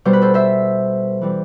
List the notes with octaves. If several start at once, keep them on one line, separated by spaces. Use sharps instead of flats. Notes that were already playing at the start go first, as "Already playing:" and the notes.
B2 G3 B3 C5
B4
A4 C5
C5 E5
E3 G3 C4